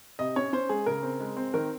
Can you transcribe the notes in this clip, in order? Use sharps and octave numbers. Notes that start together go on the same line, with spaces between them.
C3 D#5
C#4 C#5
C#4 C5
G#3 G#4
C#3 A#4
C4
G#3
C4
D#3 A#4